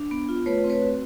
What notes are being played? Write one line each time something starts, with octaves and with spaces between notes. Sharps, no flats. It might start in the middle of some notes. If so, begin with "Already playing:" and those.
Already playing: D4
B3
F4
A3 B4 C#5
C4
B4 C#5
F#4